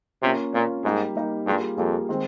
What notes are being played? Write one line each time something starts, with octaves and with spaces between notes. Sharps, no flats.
C3 A#3 C#4 F4
A#2 A#3 C#4 F4
G#2 G3 A#3 D#4 G4
G3 A#3 D#4 G4
G2 G3 A#3 F4 G#4
F2 G3 A#3 F4 G#4
D#3 G#3 C4